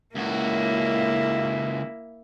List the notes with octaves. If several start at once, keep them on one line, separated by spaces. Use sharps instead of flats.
C#2 A#3 E4 F#4